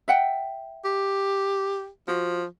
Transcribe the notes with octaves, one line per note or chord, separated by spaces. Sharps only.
E5 F#5 G5
G4
F3 F#4